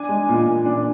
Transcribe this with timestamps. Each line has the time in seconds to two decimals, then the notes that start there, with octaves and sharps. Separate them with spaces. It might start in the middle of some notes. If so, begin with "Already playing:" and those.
Already playing: D4 G#5
0.09 G#3
0.29 A#2
0.47 A#2
0.66 D4